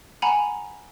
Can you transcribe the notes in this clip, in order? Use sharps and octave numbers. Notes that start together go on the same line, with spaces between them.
F#5 G#5 A#5 B5